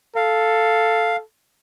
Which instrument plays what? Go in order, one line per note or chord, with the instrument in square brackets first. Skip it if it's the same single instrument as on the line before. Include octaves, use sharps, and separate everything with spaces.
[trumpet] A4 [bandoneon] F5